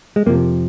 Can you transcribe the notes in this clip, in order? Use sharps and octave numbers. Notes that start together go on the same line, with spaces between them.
G#3
F2 C3 F3 A#3